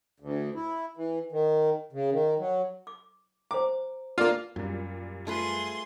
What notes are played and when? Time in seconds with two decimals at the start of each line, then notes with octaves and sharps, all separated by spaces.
0.20 D2
0.55 E4
0.97 E3
1.32 D#3
1.92 C#3
2.12 D#3
2.39 F#3
2.87 D6
3.51 C5 A#5 D6
4.18 A#3 D4 F4
4.56 F#2 A#2 G3
5.27 A3 F4 G#4 B4 C6